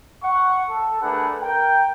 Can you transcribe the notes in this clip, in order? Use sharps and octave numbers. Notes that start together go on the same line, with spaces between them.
F#5 C#6
A4
A3 D4 G#4 A#4 B4 F#5
A#4 G5